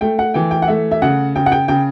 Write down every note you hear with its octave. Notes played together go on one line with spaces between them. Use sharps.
A3 G5
F#5
E3 G5
G5
F#5
A3 E5
E5
C#3 F#5
C#3 G5
F#5
G5
C#3 G5